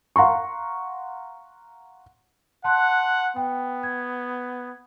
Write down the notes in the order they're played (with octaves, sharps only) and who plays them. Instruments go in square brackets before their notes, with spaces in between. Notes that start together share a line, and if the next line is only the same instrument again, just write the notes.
[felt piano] F5 F#5 A#5 C6 C#6
[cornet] F#5 [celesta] A5 C6 F#6
[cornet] B3 [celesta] G5
[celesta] G#6